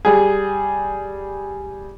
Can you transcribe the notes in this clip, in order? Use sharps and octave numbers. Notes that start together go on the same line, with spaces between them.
G3 G#4